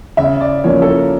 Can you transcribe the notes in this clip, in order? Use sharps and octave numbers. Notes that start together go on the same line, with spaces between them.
C#3 E5
D5
F3 A#3 C#4 E4 C#5
A4
A#4